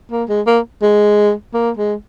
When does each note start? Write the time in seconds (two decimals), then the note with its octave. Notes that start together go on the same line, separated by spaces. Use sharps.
0.11 A#3
0.29 G#3
0.46 A#3
0.82 G#3
1.54 A#3
1.77 G#3